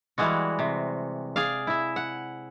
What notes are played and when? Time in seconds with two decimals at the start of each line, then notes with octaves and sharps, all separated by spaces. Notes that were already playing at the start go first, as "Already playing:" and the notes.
0.18 E3 G3 G#3 F#4
0.59 C3
1.36 G#4 D5 F5
1.67 E4 E5
1.96 F#5